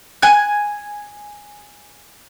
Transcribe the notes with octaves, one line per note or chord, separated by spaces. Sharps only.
G#5 F#6